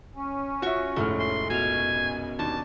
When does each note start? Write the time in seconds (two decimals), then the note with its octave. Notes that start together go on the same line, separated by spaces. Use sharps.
0.15 C#4
0.62 F4 F#4 E5 C#6
0.96 F1 A2 G#3 A3 F6
1.20 C6
1.50 F#2 B2 F5 G#5
2.39 D#2 D4 A5